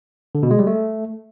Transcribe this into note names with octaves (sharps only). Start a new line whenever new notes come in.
D3
B2
G#3
G3
A3